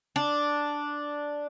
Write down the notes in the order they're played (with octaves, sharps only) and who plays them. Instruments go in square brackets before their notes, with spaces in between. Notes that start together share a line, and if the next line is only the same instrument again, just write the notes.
[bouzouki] D4